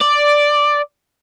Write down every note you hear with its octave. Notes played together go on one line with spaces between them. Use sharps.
D5